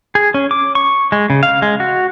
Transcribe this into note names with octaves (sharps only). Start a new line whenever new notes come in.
G#4
C#4
D6
C#6
G#3
C#3
F5
G#3
F#4